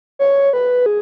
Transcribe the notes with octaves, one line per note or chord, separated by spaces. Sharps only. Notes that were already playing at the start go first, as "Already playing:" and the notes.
C#5
B4
G#4